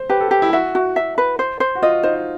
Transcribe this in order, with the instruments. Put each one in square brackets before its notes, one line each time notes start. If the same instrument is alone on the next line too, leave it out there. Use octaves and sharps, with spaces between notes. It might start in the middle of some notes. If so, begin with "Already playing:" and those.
Already playing: [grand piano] C5
[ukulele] G4 [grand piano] B4
[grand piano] A4
[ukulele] G4
[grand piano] E4
[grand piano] F#4 [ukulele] E5
[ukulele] F#4
E5
B4
C5
C5
[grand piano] F#4
[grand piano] F4 [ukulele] D#5
[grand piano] D#4 [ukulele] C5